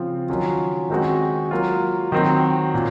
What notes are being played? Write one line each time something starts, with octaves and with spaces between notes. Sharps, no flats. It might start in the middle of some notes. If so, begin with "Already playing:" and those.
Already playing: C#3 F3 C4 F4
D#3 F#3 C#4 F4
D#3 G#3 C4 D#4 F#4
F#3 A#3 F4
D#3 F#3 C4
A#2